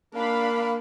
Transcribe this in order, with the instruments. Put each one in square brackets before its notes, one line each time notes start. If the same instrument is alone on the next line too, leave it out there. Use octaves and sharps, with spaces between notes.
[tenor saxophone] A#3 [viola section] D4 F5 B5